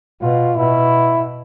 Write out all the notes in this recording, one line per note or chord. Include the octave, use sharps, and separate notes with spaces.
B2 F4
B2 E4